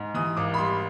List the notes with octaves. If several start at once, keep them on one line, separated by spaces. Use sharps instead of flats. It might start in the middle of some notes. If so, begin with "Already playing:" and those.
Already playing: G#2
E3 D#6
G#1 D6
B5
G3 C6